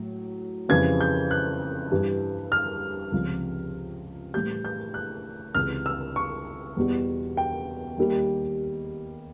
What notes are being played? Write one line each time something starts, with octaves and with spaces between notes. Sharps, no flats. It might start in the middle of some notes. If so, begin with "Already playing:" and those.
Already playing: A2 F#3
F2 C#3 E3 G3 G#6
G6
F#6
G2 E3 G3
F6
C#2 C3 F3
A2 E3 G3 G6
G6
F#6
C#2 C3 E3 F6
E6
C#6
E2 B2 G3
G5
D#2 D#3 G3